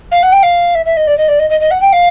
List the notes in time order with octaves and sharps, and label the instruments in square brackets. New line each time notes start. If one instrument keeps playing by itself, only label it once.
[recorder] F5
F#5
G5
F5
E5
E5
D#5
D5
D#5
D5
D#5
D#5
D#5
F#5
G5
F5